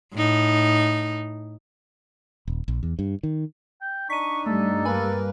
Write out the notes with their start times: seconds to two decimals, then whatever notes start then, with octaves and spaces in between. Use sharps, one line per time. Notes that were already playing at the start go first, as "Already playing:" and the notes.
0.14 A2 D#4
2.48 D#1
2.68 A#1
2.83 E2
2.99 G2
3.23 D#3
3.81 G5
4.10 D4 D#4 C#6 B6 D#7
4.46 G2 G3 A3 A4
4.85 A#3 A#4 B4 G#5 B5